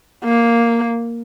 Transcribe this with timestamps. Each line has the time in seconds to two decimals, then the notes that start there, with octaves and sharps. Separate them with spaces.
0.24 A#3